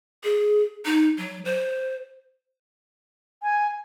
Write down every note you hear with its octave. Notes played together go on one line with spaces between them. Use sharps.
G#4
D#4
F#3
C5
G#5